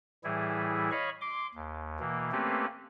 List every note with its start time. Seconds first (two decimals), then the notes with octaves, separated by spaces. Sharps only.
0.24 A2 E3 G3 E4 G#4
0.91 C#5 D#5 F5 B5 C#6
1.21 C6 D6
1.55 D#2
2.00 B2 E3 A#3
2.32 A3 A#3 C4 C#4 G4 B4